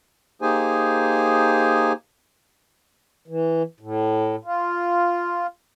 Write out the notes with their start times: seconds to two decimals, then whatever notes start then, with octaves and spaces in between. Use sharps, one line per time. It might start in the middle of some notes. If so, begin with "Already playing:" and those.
0.42 A#3 D#4 G4 G#4 C5 G#5
3.28 E3
3.80 A2
4.45 F4